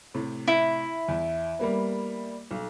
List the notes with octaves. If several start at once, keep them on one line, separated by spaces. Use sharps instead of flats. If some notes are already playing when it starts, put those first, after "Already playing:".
A2 C3
E4
E2
G3 A#3 B3
B1